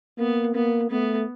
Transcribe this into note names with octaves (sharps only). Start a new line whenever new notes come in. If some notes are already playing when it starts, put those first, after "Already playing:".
A#3 B3
A#3 B3
A3 B3